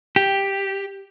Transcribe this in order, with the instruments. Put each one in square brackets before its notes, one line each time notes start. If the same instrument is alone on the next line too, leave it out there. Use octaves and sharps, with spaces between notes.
[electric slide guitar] G4